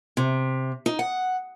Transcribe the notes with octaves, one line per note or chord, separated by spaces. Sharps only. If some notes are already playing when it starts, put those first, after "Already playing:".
C3
D#4
F#5